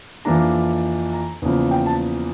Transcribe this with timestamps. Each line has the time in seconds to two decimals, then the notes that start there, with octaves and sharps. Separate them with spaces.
0.25 F2 E3 A#3 D4 A#5
1.13 A#5
1.42 E2 C#3 F3 A#3
1.71 G5
1.86 A5